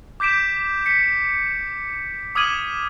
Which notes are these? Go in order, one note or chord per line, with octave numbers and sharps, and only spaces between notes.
D6 G6 B6 D7 E7
B6 C#7
D6 D#6 F6 G#6 D#7 F#7